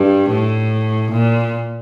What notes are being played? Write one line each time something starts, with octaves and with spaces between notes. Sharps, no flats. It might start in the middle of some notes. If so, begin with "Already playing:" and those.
Already playing: G2
A2
A#2